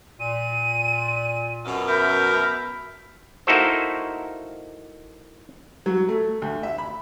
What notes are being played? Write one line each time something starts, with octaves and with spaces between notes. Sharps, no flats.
A#2 D#7
F#2 B2
A#4 E5 B5 G6
A#3 D#4 E4 F#4 A4 C5
F#3
A3
D2
E5
B5